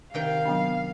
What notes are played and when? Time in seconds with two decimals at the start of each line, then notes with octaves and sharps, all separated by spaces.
0.14 C3 D#3 F5 G5
0.46 F#3 B3 D4